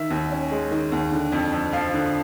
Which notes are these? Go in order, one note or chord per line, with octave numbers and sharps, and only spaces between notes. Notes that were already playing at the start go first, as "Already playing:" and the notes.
Already playing: D#3 E5
D#2
C#4
G#3
D#3
D#2
D3
F2
F2
F3 F5
D3